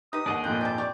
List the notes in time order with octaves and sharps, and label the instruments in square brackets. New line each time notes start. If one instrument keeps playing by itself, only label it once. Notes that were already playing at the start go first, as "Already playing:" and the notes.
[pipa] D#4 B4 [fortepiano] G4 [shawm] D#6
[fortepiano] D#2 F#5 [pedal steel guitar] D4 G#4 D#5
[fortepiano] G#1 F2 A#2 [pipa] F#5 [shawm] G5
[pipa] D5 A5 [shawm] G5
[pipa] G4 C#6 [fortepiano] D5